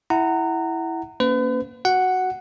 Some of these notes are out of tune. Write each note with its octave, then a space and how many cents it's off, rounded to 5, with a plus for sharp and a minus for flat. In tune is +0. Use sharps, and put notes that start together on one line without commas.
E4 +0 F#5 +15 A#5 -25
A#3 +0 C#4 +0 B4 +40
F#4 +0 F#5 +0